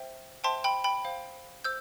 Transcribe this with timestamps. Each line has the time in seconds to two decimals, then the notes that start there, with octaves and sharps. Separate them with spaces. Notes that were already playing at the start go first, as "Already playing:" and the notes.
Already playing: C5 E5 G5
0.44 C5 E5 G5 A5 C6
0.64 G5 B5
0.84 G5 B5
1.05 C5 F5
1.64 C5 E6 G6